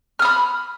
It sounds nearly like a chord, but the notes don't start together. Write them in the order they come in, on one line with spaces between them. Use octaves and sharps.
F6 D#6 B5